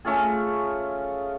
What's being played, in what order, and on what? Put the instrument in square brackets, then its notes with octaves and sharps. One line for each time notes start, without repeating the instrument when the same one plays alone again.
[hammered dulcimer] A3 C#4 F4 G#4